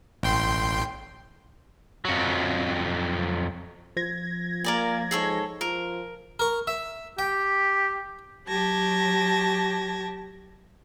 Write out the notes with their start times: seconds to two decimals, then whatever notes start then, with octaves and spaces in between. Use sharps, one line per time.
0.23 A1 G5 C6
2.05 F2 F#3
3.97 F3 G#6 A#6
4.64 A#3 A#4 D5 G#5
5.11 G#2 G#4 A4 C#5
5.61 F3 A#4
6.39 A#4 C#6
6.67 E5
7.19 G4 G5
8.46 F#3 G4 A5 G#6 A#6